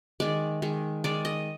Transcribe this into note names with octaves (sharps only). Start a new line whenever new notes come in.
D#3 G#3 D5
D#3 G#3
D#3 G#3 D5
D#5